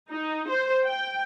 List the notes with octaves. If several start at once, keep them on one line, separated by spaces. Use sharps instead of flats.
D#4
C5
G5